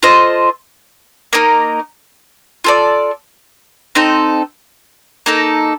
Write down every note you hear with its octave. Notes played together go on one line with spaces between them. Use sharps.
F4 A4 C5 D#5
A#3 D#4 A#4
F4 A4 D5
C4 D#4 A4
A#3 D#4 A4